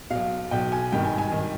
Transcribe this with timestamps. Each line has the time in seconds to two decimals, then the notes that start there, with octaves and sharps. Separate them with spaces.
0.10 B1 B2 F5
0.51 B1 B2 G5
0.72 G#5
0.92 G#1 G2 D#3 G5
1.05 G#5
1.18 G#5
1.32 D#3